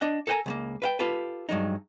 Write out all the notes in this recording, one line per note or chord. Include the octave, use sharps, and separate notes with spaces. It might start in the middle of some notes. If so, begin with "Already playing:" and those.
D4 D#5 F#5
A4 A#4 C5 G5 G#5 A#5
C#2 A3 A#3
B4 F5 G5
F4 G4 A4 B4
G2 F#3 G#3 D#4